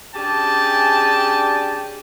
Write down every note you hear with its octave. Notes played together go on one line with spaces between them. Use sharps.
C#4 D4 G4 G#4 G5 A5